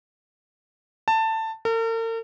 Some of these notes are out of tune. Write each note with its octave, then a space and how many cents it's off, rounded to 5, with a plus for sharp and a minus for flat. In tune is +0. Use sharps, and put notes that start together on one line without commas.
A5 +15
A#4 -45